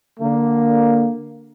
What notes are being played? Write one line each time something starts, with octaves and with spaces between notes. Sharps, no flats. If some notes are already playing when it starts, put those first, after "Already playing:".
D3 A#3